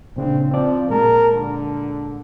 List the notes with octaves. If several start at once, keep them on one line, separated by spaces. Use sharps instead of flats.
A#2 C#3 C4 D4
F3 C4 D5
A#2 G#3 A#4 A5
D3